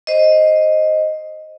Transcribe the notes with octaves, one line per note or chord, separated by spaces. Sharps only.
C5 D#5